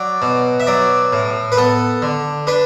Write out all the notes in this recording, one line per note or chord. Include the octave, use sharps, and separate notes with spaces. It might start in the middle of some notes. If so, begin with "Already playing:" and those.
Already playing: F#3 D5
B2
E5
F#3 D5
A2
B4
B3 A4
D3
D4 B4